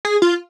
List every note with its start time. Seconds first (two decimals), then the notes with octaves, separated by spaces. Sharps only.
0.05 G#4
0.22 F4